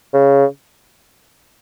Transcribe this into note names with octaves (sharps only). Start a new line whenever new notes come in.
C#3